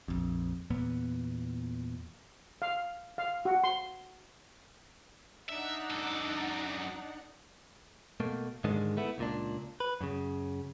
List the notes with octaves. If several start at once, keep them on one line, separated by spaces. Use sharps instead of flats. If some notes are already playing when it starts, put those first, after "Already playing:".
A#1 F2
E2 A#2 B3
F5
F5
F#4
C6
D4 D#4 E5 F#5
F#2 A4
B2 A3 A#3
G#2 D3 D#3 G#3 D4
A3 B3 E4
C#2 A#2 D4
B4
F#2 C#3